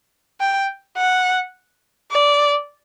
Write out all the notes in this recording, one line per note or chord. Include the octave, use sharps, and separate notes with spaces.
G5
F#5
D5